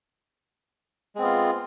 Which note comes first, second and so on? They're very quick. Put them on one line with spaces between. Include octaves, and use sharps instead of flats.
G#3 C4 B3 F4